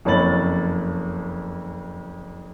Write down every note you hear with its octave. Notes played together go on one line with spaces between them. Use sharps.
F#1 F2 C#5 B5 A6 F#7